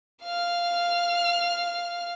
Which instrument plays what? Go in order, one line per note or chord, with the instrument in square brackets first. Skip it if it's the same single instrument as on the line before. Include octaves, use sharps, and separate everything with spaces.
[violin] F5 F6